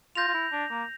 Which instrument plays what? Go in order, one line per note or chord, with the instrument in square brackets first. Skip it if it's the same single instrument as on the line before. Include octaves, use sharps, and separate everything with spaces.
[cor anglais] F4 [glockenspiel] G6 A#6 F7
[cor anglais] F4
E4
D4
A#3